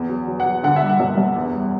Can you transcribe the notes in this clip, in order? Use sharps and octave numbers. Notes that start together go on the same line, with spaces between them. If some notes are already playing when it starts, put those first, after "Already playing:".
Already playing: E2
F#3
F#3
F#5
F#3
D3 F#5
E5
G3
F#5
F#2
F#2
E2
G3